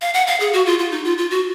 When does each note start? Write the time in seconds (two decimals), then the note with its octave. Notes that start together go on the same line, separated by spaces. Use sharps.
0.02 F5
0.14 F#5
0.27 F5
0.40 G#4
0.53 F#4
0.66 F4
0.79 F4
0.92 D#4
1.05 F4
1.18 F4
1.31 F#4